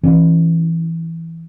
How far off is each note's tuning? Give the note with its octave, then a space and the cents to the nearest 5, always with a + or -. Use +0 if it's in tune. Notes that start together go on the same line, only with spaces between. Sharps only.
E3 +0 C#4 -35